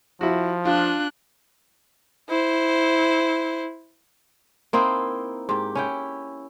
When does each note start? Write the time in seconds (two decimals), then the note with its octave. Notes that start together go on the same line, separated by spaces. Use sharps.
0.21 F3 E4 F#4
0.65 D4 F4 F#6
2.29 E4 C5
4.73 A#3 C4 D#4 E4
5.49 G#2 G4
5.75 C#4 E4 G5